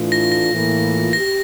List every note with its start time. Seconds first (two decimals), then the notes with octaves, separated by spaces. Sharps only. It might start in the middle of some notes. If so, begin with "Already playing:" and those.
Already playing: A2 E3 A3 D4 F4
0.12 A#6
0.32 A#6
0.52 A2 E3 A#3 F4
1.13 G4 A#6